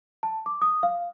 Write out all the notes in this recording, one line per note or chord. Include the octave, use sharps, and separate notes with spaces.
A5
D6
D#6
F5